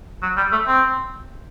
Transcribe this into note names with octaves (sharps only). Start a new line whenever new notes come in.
F#3
G3
A3
C4